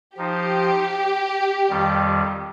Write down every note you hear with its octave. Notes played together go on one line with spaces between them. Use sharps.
F3 D#4 G4 C5
F2 D#3 G3